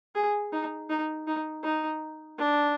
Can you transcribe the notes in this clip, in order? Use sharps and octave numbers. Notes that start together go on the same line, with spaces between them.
G#4
D#4
D#4
D#4
D#4
D4